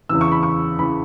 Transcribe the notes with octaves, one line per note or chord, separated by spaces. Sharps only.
E2 C#3 E3 E6
C#6
B5
C#6
C#3 E3 B5